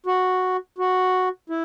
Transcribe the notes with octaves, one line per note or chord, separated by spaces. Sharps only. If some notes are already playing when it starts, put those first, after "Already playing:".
F#4
F#4
E4